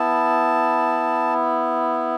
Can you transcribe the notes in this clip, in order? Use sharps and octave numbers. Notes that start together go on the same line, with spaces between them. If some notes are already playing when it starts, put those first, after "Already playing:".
Already playing: B3 E4 A5